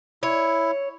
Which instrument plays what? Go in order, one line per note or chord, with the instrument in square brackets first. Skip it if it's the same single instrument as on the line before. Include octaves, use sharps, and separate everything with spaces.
[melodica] E4 [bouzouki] C#5